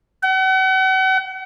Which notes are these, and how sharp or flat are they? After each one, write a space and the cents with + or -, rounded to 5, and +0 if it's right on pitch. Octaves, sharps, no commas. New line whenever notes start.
F#5 +40